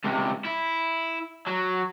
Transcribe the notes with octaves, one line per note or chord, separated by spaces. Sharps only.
C#2 C3
E4
F#3